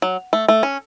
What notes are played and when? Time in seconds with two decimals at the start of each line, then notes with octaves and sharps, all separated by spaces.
0.02 F#3
0.33 A3
0.48 A3
0.63 C#4